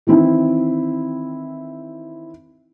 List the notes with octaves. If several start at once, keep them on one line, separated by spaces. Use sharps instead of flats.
D#3 E3 C4 E4